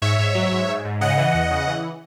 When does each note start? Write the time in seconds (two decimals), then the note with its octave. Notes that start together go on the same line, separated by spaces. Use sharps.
0.02 G#2 C#5 E5
0.19 G#2
0.35 F#3
0.51 G#2
0.68 G#2
0.85 G#2
1.01 C#3 D#5 F#5
1.17 E3
1.34 E2
1.51 C#3
1.67 E3